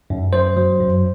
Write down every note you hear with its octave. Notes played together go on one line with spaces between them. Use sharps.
F#2
F#3 C5
F#3
F#2